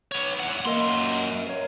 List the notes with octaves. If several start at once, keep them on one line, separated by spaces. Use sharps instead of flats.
B3 C#5
E2 F#5
F#2 A#3 A#4 D#5 C6
A#4 C#5